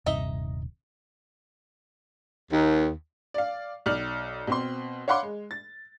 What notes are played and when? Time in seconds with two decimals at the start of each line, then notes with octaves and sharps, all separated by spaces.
0.06 D#1 G2 C3 D#4 D#5 E5
2.52 D#2
3.34 D5 F5
3.86 B1 D5 F6 F#7
4.47 B2 C4 C6
5.08 C#5 F5 F#5 B5 C6 D6
5.23 G#3
5.51 A6